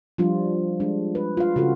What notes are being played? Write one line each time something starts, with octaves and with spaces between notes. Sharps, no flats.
F3 G3 D4 F4
G#3 D4
B4
F4 F5
C#3 F4 F#4 A4